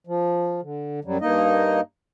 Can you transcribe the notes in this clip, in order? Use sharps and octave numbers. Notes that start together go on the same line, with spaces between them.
F3
D3
F#2 F#3 G3
G2 A#3 D#4 D#5